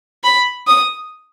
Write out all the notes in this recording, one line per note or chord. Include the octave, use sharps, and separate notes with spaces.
B5
D#6